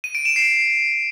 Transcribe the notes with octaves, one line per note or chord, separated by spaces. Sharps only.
D#7
D7
E7
C7